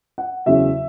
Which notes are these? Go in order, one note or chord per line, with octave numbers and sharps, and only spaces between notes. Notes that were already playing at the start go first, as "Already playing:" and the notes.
F#5
E2 C#3 F#3 E5